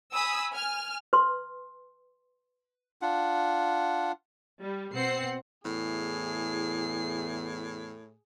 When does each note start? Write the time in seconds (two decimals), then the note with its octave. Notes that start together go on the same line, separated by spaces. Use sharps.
0.12 G#5 B5 D#6 E6
0.51 G#5 F6
1.13 B4 C6
3.02 D4 F4 F#5
4.62 G3
4.93 B2 C4 F#5 C7
5.65 E2 A2 G#4 C7